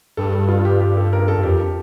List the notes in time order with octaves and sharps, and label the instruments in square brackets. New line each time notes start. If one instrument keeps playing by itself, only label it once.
[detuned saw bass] G2 [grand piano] A4
[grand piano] A4
F4
G4
G4
A4
A#4
A4
[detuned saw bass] G2
[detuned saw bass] F2 [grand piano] G4